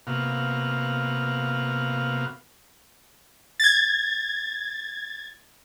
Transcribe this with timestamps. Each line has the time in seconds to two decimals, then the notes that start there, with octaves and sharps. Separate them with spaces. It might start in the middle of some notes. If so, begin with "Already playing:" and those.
0.07 C3 A#3 B3 F#4 F5
3.60 G#6 A6